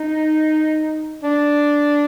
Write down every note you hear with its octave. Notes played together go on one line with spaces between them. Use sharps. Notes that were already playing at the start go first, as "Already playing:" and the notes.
Already playing: D#4
D4